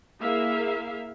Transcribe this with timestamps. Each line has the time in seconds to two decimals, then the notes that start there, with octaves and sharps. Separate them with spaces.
0.20 A#3 E4 G#4 E5 F5